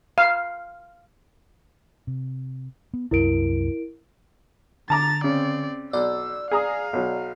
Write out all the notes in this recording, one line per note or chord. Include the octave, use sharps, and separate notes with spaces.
F5
C3
B3
C2 F#2 C3 E4 A#4 D7
D3 A5 A#5 D6 A6
C#3 C4 D5
B1 D5 E6
G#4 F5 A#5 D#6
B1 F#3